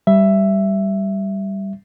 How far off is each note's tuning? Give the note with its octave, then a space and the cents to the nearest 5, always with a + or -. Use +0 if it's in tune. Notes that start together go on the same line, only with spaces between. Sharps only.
G3 +0 E5 +10